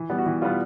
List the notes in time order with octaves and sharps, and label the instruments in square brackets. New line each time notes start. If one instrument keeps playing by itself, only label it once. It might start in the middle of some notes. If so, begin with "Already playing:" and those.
Already playing: [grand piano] E3
G3 B3
F#4
E3 G4
G3 B3 F4